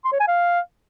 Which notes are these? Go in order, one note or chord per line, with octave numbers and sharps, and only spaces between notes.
C6
C#5
G#5
F5